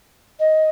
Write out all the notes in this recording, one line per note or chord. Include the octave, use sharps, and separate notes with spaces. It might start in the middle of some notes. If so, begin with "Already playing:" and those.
D#5